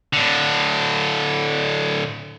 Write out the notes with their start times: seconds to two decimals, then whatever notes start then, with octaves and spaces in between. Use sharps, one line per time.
0.13 A2 D3